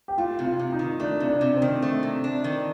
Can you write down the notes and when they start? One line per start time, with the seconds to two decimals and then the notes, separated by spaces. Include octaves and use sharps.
0.08 G4
0.18 A3 F4
0.39 C3
0.45 F4
0.59 C3
0.72 D#4
0.79 D#3
1.00 A3 D4
1.20 C3
1.27 D4
1.41 C3
1.56 C4
1.62 D#3
1.82 A3
2.03 C3
2.24 D4
2.44 D#3